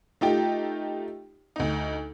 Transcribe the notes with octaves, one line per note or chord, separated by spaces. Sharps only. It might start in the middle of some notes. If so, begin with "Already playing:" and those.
A3 D#4 F4 G4 G5
D2 D#4